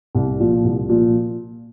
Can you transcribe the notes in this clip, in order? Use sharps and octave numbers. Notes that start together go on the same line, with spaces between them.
C2
A#2 F3
C2
A#2 F3